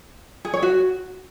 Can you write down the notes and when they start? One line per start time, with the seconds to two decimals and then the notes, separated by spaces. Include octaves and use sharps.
0.45 G#4
0.54 C#5
0.62 F#4